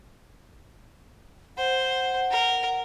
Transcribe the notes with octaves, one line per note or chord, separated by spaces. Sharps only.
C5 F#5
A#4